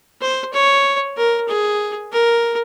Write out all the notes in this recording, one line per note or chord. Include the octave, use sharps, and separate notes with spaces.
C5
C#5
A#4
G#4
A#4